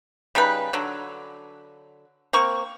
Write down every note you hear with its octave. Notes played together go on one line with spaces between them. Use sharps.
C#3 G3 D#4 B4
D3 F#3
A#3 C4 C#6